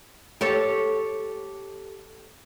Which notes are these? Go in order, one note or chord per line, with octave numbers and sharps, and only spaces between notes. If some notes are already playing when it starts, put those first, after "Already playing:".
G4 A4 C#5